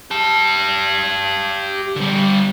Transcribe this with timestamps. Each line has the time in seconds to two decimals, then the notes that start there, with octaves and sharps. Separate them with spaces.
0.11 G4 A5
1.96 D3 G3